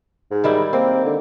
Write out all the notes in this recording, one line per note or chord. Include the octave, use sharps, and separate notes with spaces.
G#2
D#3 G3 E4
A#3 C4
D3